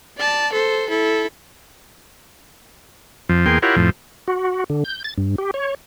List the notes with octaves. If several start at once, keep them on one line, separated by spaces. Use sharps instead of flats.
D5 A5
A4 C5
E4 A4
F2 F3
E2 A#3 G#4 G5 C6
E4 F4 G4 A#4 C#5 F#5
F2 A2 F3
F#4
D3
G6
A6
G2
G4
C#5